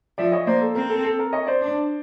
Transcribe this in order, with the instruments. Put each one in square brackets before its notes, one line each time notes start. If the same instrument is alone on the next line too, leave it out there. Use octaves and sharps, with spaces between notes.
[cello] F3 [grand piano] D5 E5
[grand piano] C#5 D#5
[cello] A#3 [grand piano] C5 D5
[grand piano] A4
[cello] C4 [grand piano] A#4
[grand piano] A4
A4
A#4
C#5 D#5
C5 D5
[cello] D4